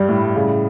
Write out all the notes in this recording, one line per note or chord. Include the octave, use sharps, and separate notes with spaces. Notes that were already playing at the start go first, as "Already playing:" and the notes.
Already playing: G2 G3
A2
C#3